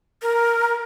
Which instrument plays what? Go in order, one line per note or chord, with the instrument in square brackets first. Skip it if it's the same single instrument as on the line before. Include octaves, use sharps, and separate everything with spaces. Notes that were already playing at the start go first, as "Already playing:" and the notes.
[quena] A#4